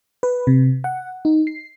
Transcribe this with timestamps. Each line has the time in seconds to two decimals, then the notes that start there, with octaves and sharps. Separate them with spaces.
0.23 B4
0.47 C3
0.84 F#5
1.25 D#4
1.47 C7